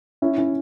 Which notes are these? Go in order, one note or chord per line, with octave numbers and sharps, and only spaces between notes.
C#4 E4
C#4 E4